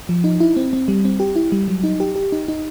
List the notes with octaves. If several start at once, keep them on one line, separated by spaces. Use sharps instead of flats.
F3
D#4
E4
C4
C4
G3
C4
G4
E4
G3
F#3
D#4
G4
G4
D#4
D#4